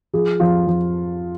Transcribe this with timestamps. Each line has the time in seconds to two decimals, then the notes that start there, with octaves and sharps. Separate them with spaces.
0.13 F3 G#4
0.40 F2 F4
0.67 F2